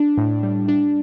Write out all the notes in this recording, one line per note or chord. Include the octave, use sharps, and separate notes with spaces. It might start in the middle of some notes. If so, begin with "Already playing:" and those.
Already playing: D4
A2
G3
D4